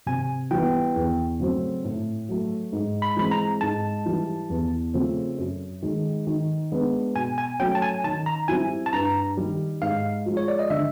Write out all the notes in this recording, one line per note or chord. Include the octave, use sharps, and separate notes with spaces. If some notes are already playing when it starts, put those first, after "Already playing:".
C3 G#5
E3 G3 B3 G5
E2
C#3 F#3 A3 C4
A2
F#3 A3
G#2
B5
E3 G#3 C4 B5
A#5
G#2 A5
E3 G3
E2
C#3 F3 A3 C4
F#2
D#3 G#3
D#3
G#3 B3 D4
B2 G#5
G#5
F#3 A3 C#4 G5
A5
G#5
D#3 A5
A#5
G3 C4 E4 G#5
A5
G2 A#5
D#3 G3
G#2 F5
F3 G#3
C#5
D5
D#5
D3 E5